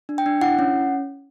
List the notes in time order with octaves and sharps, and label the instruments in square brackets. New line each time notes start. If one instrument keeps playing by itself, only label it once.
[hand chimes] D4
G5
D4
E4 F#5
C#4